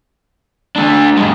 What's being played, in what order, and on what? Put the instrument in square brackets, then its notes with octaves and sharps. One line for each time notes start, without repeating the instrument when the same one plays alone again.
[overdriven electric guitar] A3 D4
F#2 G#3